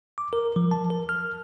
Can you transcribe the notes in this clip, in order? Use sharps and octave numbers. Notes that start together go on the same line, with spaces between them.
D6
A#4
F3
A5
A#4
F6